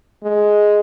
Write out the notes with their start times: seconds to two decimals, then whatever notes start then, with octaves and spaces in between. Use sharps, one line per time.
0.24 G#3